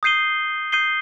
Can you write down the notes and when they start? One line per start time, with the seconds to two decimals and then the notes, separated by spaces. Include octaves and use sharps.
0.03 D#6 G6 C7 D#7 G7
0.72 D#6 G6 C7 D#7 G7